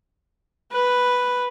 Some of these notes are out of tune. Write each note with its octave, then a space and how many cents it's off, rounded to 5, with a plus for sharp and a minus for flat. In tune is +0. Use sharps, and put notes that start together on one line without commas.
B4 +0